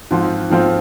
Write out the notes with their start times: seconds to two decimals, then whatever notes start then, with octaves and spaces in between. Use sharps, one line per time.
0.11 G#2 F3 C4 F4 C5
0.50 G#2 F3 C4 F4 C5